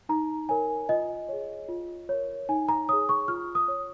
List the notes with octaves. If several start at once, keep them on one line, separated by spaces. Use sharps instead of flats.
D#4 A#5
A#4 C#5 G#5
F4 D#5
G#4 C#5
F4
A#4 C#5
D#4 G#5
A#5
G#4 C#5 D#6
C#6
F4 F6
D#6
C#5